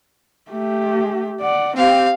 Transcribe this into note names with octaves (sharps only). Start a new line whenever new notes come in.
A3 G4
D5 F#5
C4 G4 F5